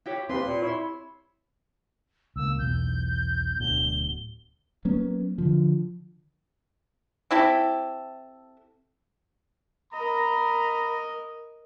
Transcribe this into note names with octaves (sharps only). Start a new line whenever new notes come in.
E4 G4 C#5
D#2 C4 G4 B4 C6
A#2
E4 C#5
C#2 A#3 E6
B1 E2 G6
D1 B2 D3 G7
F#3 A#3 B3 C#4
D3 F3
C4 E4 G4 A4
A#4 D#5 A#5 B5